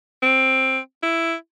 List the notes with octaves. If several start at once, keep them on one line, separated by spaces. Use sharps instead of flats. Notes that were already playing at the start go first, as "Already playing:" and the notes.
C4
E4